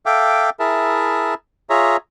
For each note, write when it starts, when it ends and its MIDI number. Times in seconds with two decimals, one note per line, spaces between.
0.06 0.50 69
0.06 0.50 76
0.06 0.50 77
0.06 0.50 79
0.06 0.50 86
0.60 1.34 64
0.60 1.34 68
0.60 1.34 70
0.60 1.34 76
0.60 1.34 81
1.70 1.97 65
1.70 1.97 68
1.70 1.97 73
1.70 1.97 76
1.70 1.97 82